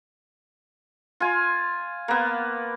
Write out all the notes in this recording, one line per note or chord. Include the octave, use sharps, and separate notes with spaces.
F4 G#5
A#3 B3